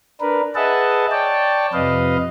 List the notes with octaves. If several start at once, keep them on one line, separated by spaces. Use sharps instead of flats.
D4 A#4 B4
G#4 B4 D#5 E5 F#5 A5
C#5 D5 G5 A5
F2 C3 B4 D#5 F5